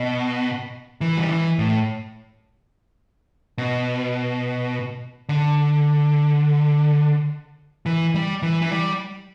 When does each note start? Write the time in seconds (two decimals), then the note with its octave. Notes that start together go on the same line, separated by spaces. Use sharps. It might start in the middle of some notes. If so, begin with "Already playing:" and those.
Already playing: B2
1.01 E3
1.17 G3
1.29 E3
1.59 A2
3.58 B2
5.29 D3
7.86 E3
8.14 G3
8.42 E3
8.62 E3
8.71 G3